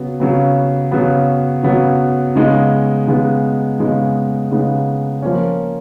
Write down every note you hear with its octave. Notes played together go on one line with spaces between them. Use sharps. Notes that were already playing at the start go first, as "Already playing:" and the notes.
Already playing: C#3 F#3 B3
C#3 F#3 B3
C#3 F#3 B3
C#3 F#3 B3
C#3 G#3 B3 D#4
C#3 G#3 B3 D#4
C#3 G#3 B3 D#4
C#3 G#3 B3 D#4
F3 A#3 C#4